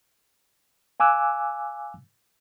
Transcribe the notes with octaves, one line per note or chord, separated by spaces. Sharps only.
F5 G#5 D6 E6 F#6